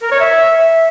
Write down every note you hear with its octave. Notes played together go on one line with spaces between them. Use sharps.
A#4
C#5
E5